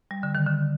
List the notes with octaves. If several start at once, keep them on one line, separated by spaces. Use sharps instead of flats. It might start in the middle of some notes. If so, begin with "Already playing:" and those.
G3
D3
D#3
D3